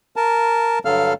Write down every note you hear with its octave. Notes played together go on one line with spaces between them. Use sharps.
A#4 A5
G2 D3 F#3 A4 F5 F6